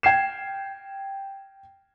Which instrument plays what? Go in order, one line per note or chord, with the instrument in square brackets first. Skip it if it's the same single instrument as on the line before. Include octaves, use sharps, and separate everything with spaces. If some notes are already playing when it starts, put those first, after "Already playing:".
[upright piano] G5 G#6 C7 E7